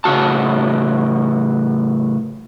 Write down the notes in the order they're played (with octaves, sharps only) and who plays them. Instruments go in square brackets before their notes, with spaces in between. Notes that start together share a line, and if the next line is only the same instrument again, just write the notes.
[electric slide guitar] A2 C#3 E3 F#4 A5